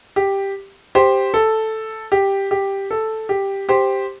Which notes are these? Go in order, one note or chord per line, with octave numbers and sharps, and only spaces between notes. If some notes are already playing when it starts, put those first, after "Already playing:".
G4
G4 C5
A4
G4
G4
A4
G4
G4 C5